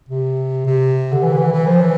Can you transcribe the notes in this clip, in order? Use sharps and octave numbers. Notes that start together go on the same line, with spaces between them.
C3
C3
D3
E3
D3
E3
E3
F3
E3